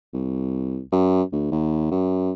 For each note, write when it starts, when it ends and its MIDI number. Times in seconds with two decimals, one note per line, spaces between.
0.14 0.80 36
0.92 1.22 42
1.32 1.50 38
1.52 1.89 39
1.91 2.32 42